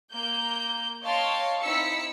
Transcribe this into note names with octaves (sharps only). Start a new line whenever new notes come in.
A#3 G6
C#5 D#5 F5 G5 A5 C6
C4 D#4 E4 E6 B6 C#7